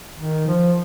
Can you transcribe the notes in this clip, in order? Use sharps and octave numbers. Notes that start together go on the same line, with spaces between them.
D#3
F3